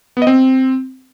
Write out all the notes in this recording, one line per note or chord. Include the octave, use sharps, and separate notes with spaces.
B3
D#5
C4